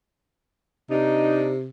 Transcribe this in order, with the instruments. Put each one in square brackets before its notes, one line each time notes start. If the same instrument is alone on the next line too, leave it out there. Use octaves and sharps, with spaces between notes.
[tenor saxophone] C3 [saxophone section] D4 D#4